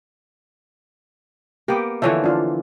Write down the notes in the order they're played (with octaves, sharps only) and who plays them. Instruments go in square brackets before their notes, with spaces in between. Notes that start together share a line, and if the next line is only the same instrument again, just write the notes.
[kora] A#3 B3 [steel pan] G4 G5
[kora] D3 E3 F3 [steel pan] C#5 E5
[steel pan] D4 F4